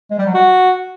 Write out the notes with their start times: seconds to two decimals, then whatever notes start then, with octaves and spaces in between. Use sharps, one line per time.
0.11 G#3
0.18 G3
0.26 F#3
0.34 F#4